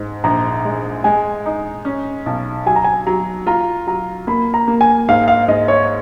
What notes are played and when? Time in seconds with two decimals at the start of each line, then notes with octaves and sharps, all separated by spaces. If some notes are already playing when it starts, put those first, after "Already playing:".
Already playing: G#2
0.24 A#1 A#5
0.65 G#3
1.04 G#3 G#5
1.46 D#4
1.85 C#4
2.26 B1
2.66 F#3 G#5
2.76 A#5
2.84 G#5
3.07 F#3 A#5
3.47 F4 A#5
3.87 F#3 A#5
4.27 A#3 B5
4.54 A#5
4.68 A#3
4.81 G#5
5.08 G#2 F5
5.28 F5
5.48 G#2 D#5
5.68 C#5